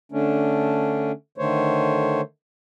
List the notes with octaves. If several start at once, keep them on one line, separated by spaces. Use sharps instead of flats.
D3 A3 C#4 D4
D3 D#3 A3 C5 C#5